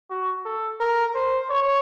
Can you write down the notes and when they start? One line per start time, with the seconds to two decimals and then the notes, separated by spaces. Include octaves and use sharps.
0.11 F#4
0.45 A4
0.80 A#4
1.15 C5
1.50 C#5